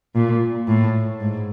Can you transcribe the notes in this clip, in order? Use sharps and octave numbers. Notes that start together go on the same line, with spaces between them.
A#2
A2
G#2